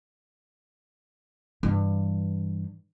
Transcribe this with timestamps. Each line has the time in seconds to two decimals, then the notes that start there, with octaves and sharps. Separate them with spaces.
1.63 G2 E3